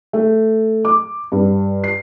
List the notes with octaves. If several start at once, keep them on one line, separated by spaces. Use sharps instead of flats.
A3
D6
G2
C7